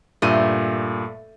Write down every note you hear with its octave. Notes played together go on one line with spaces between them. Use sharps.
G2 A#2 A3 D#7